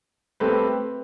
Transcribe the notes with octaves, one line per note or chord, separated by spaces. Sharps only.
A3 C4 G4 B4